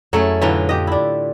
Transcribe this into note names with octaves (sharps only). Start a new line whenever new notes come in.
F2 F#3 A3 C#4 E4 G#4 A4
A2 D3 E3 F#3 F4
G4 D#5
D4 E4